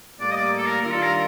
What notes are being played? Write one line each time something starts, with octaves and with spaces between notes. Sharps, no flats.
A2 G3 A#3 D5
D#5
D5
A4
A#4
D#3 G3 D4 F4 A#4
A4
A#4